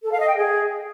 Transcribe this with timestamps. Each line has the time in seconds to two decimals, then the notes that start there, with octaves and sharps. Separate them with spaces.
0.04 A4
0.12 F5
0.20 D#5
0.28 G5
0.36 G#4